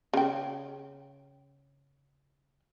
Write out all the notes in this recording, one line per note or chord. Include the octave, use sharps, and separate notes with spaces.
C#3 G5